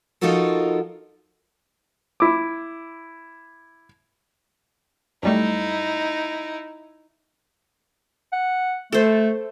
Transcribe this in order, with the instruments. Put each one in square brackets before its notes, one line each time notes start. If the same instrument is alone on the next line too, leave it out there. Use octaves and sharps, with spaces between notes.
[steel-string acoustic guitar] F3 D#4 F4 F#4 A4 A#4
[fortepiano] E4 D6
[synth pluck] F#2 G3 A3 [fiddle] D#4 E4
[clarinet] F#5
[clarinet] A3 [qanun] A4 C5